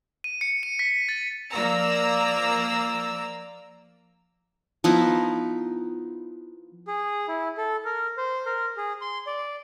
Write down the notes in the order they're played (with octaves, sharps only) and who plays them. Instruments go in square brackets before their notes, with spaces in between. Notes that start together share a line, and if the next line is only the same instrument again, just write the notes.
[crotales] D#7
C#7
D#7
B6
A6
[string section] F3 A#3 D5 A#5 E6
[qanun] F3 B3 D#4 E4
[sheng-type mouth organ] G#4
E4
A4
A#4
C5
A#4
G#4
C6
D5